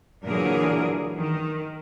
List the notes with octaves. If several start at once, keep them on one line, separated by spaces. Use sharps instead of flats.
A#2 D3 E3 F#3 G#4 A#4
D#3